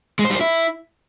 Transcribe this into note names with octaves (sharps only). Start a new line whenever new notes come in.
G#3
C5
G3
C5
E4